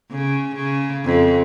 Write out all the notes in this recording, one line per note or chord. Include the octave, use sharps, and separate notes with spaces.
C#3
C#3
F2